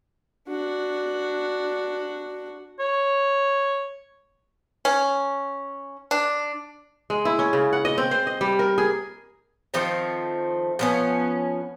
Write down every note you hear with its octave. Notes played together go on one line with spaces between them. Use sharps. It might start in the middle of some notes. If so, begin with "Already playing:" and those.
D4 F#4
C#5
C#4
D4
G#3
E4
C#4
C#3
F#5
D#5
C4
C5
D#5
G3
A#4
G#4
D#3 F3 A3 C4
F3 B3 C#4